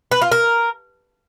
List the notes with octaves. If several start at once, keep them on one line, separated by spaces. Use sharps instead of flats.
B4
F4
A#4